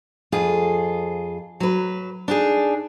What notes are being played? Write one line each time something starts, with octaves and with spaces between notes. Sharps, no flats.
F2 F4 G#4
F#3 B4
D4 D#4 G#4